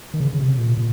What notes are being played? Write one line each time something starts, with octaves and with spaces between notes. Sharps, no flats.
D#3
C#3
C#3
C3
A#2
A#2